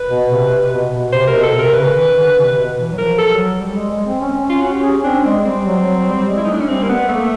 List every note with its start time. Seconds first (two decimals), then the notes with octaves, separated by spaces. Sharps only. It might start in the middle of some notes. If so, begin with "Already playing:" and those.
Already playing: B4
0.09 B2
0.30 C3
0.51 C3
0.71 B2
0.92 B2
1.12 C3 C5
1.28 A#4
1.33 B2
1.43 A4
1.54 C3
1.59 A#4
1.74 C#3 B4
1.95 D#3
2.15 D3
2.36 C3
2.57 B2
2.78 E3
2.92 F#3
2.98 F3 A#4
3.18 A4
3.29 F#3
3.59 G3
3.75 G#3
3.91 G#3
4.06 C4
4.21 C#4
4.42 C#4
4.50 F4
4.61 C#4 F#4
4.72 G4
4.83 C#4 G#4
5.04 C4 D4
5.24 G#3 C4
5.45 G3 C4
5.65 F#3
5.85 F#3
6.07 G3
6.27 G#3
6.37 E4
6.44 D#4
6.48 A3 D4
6.61 C#4
6.68 G3 C4
6.83 A#3
6.89 A3 B3
7.09 A3 A#3